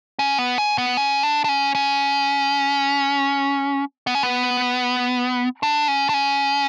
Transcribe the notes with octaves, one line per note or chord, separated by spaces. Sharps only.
C#4
B3
C#4
B3
C#4
D4
D4
C#4
C#4
B3
C#4
B3
D4
C#4
D4
C#4